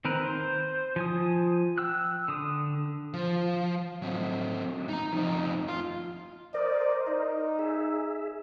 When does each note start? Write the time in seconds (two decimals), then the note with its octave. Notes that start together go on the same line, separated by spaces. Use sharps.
0.05 D#3 C4 A#4 B4
0.24 C5
0.96 F3 G#5 D#6
1.78 G5 E6 F#6
2.28 D3 D#6
3.14 F3
4.02 F#3 C4
4.89 D#4 A#5
5.13 F2 D#4
5.68 F4
6.54 A#4 C5 D5 D#5
7.08 D#4
7.59 G#4 E5